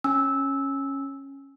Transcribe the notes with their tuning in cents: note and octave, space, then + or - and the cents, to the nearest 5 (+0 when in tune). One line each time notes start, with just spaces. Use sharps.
C#4 -15 G#5 +0 E6 -15